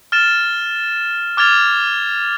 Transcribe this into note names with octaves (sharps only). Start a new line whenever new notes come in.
F6 A6 E7
D6 F6 G#6 A6 F7